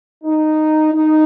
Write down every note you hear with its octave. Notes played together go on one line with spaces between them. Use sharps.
D#4
D#4